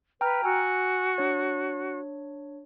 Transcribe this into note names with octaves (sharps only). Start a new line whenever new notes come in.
B4 G5 A#5 F6
F#4 G#5 E6
D4 C#5